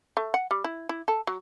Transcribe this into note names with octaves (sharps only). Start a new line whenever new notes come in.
A3
F#5
G3
E4
E4
A4
F#3